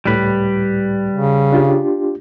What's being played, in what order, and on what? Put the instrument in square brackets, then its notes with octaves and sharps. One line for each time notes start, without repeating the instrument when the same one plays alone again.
[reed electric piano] C#2 A2 [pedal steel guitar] G3 B4
[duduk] C#3
[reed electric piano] D4 F4 G4